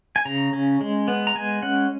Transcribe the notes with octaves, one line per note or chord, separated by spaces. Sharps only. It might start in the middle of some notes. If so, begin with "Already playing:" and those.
G#5
C#3 A#5
C#4
G#3
B3
A#5
G#3 G#5
C#4 F#5